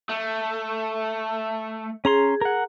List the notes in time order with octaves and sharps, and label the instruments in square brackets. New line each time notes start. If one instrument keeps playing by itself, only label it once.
[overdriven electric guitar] A3
[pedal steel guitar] C#4 A#5 C6 [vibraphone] G#4
[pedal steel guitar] A#4 F#5